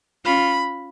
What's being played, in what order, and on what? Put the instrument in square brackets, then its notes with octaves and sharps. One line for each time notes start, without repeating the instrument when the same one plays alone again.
[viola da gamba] C#4 F4 [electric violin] B5